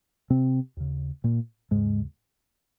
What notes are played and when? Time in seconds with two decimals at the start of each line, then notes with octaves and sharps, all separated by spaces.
0.30 C3 C4
0.77 D#2 C#3
1.24 A#2 A#3
1.71 D#2 G#2 C#3 G#3